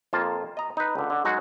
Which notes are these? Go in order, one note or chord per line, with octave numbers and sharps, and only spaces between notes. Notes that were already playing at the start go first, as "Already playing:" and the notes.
F2 A#3 F4 A5
D#5 A#5
D#4 B4
C#2 D3
D3
F#3 G#3 D#4 F#4